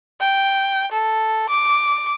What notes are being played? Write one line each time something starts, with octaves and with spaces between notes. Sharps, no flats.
G5
A4
D6